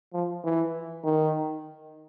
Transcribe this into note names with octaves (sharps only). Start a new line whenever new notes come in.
F3
E3
D#3